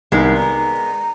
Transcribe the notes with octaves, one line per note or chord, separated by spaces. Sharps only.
C2 D#3 G#3 B3 D#4 A#4
D5 A#5